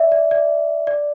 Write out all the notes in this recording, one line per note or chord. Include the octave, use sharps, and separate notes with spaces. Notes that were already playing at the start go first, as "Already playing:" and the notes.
Already playing: D5 E5
D5
D5
D5